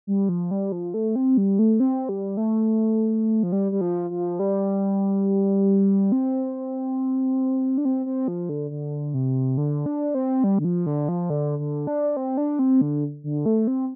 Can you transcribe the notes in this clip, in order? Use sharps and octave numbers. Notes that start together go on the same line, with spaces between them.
G3
F3
G3
F3
A3
C4
G3
A3
C4
G3
A3
F3
G3
G3
F3
F3
G3
C4
D4
C4
C4
F3
D3
D3
C3
D3
D4
C4
G3
D3
F3
D3
F3
D3
D3
D4
C4
D4
C4
D3
D3
A3
C4